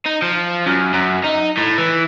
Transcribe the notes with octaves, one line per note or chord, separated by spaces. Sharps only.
D#4
F3
F#2
F#2
D#4
A2
E3